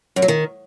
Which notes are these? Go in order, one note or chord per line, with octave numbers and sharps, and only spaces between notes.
F#2
F#3
D#3